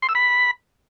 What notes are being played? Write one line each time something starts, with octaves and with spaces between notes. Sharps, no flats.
C6
E6
B5